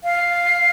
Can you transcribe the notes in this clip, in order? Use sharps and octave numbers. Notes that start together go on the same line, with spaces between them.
F5